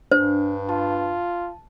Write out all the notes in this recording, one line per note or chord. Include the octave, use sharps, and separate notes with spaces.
G2 D4 C5
F4 A5